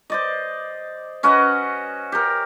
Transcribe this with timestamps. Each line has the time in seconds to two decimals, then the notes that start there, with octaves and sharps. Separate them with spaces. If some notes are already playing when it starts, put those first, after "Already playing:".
0.10 C5 D5 D#5
1.23 C#4 F#4 B4 D#5
2.12 G4 A#4